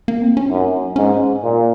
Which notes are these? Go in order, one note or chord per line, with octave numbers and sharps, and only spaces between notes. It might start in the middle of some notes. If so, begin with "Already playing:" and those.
A#3
C4
C#4
F#2 D#4
G#2 C#4
A#2